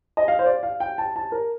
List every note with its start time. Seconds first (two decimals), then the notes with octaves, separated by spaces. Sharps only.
0.17 D#5
0.28 F5
0.39 C5
0.46 D5
0.63 F5
0.80 G5
0.98 A5
1.16 A5
1.32 A#4